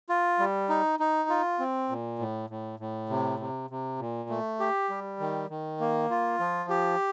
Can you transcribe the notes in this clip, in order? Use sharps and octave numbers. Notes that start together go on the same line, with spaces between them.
F4
G3
D#4
D#4
F4
C4
A#2
A2
A2
A2
C3
C3
C3
A#2
A3
G4
G3
D#3
D#3
A#3
F4
F3
G4